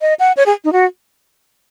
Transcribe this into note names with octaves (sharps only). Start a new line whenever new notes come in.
D#5
F#5
C#5
G#4
D#4
F#4